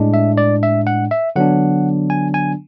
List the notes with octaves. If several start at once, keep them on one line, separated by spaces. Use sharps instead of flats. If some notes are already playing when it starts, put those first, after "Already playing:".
Already playing: A2 G#3 D4
E5
D5
E5
F#5
E5
D3 F#3 B3 D4 F#5
G#5
G#5